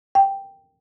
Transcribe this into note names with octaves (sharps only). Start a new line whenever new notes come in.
G5